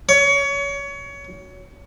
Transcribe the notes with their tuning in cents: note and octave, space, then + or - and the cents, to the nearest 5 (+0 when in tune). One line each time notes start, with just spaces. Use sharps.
C#5 +25